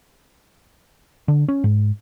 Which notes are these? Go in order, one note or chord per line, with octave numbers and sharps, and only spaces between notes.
D3
C#4
G#2